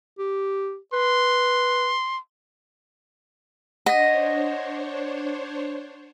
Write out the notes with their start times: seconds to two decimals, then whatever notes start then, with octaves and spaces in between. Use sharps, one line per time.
0.18 G4
0.93 B4 C6
3.86 D4 C5 C#5 D#5 F#5 A#6